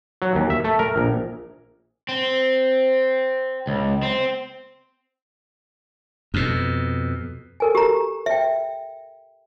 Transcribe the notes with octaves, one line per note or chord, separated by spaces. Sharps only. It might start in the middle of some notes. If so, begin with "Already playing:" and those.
F#3
D#2
E5
A3
A#4
A#1
C4
C#2
C4
F2 B2
A4 A#4 G#5
G4 A#5
E5 G5